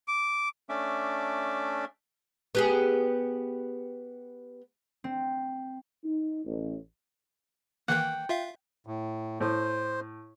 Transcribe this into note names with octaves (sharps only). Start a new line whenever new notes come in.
D6
A3 C#4 D4 E5 D6
B3 G4 G#4
C4
D#4
A1
D#3 E3 A#3 F#5 G5
F4 E5 F5
A2
A2 C5